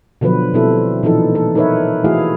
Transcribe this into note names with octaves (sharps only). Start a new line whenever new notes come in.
B2 D3 F3 F#3 B4
B2 G3 C4 E4 A4
A#2 E3 F3 D#4 A4
A4
D#4 A#4 B4 C#5 E5
E3 A3 E4 F#4 G#4 F5